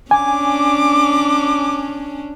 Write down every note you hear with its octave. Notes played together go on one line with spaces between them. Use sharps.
C#4 D4 G#5 D6